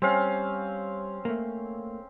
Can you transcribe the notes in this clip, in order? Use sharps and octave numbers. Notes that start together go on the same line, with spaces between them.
G3 C4 C#4 F5
A3 A#3